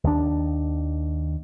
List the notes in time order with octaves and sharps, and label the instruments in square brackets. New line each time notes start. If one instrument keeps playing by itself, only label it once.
[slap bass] D#2 D#3 D4